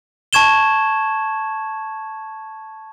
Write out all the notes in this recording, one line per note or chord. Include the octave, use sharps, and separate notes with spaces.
A5 C#6 G#6 E7 G7